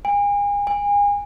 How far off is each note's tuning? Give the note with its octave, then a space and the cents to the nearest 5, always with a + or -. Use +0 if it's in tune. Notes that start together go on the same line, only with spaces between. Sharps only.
G#5 -35
G#5 -30